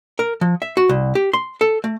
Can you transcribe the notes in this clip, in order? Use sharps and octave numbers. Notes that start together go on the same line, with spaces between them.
A#4
F3
E5
F#4
C2
G4
C6
A4
A3